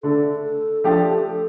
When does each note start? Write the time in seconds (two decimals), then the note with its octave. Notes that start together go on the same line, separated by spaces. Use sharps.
0.03 D3 A3 D4 A4
0.44 A4
0.84 F3 A3 D4 G4
1.25 A4